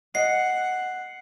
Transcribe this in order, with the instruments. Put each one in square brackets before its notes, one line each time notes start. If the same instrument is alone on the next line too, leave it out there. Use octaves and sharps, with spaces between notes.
[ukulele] D#5 [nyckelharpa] F#5 [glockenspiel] C7